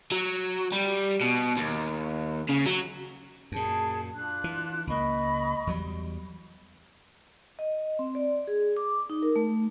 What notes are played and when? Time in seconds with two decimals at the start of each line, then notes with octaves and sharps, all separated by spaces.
0.12 F#3
0.72 G3
1.21 B2
1.57 D#2
2.49 C#3
2.66 F#3
3.52 F#2 A#2 G#4 A5
4.13 D4 F4 F#6
4.44 E3
4.87 C#2 A#3 D#5 B5 C#6
5.67 E2 F#3 G3
7.59 D#5
7.99 C4
8.15 D5
8.47 G#4
8.77 D6
9.10 D#4
9.22 A#4
9.36 A3